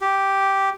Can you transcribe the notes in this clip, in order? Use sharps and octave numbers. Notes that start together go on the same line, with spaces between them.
G4